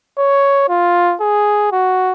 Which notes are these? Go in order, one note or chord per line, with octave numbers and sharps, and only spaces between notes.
C#5
F4
G#4
F#4